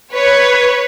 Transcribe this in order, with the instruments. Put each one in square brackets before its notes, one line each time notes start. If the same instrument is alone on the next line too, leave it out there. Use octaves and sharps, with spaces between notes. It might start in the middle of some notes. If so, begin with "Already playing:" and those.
[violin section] B4 C#5